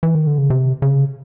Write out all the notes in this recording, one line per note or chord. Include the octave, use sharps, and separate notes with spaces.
E3
D#3
D3
C#3
C3
C#3